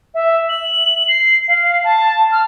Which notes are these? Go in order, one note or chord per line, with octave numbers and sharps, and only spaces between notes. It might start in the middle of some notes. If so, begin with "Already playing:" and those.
E5
F#7
C7
F5
A5
F6